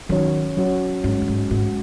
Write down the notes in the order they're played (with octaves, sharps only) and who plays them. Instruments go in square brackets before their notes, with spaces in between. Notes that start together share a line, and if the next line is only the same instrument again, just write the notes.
[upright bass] D#3 [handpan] F#3 C#4 F#4 C#5
[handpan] F#3 C#4 F#4 C#5
[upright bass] G#2 [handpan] G#3 C#4 F#4
[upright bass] F#2
G#2
[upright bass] G#2 [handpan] G#3 C#4 F#4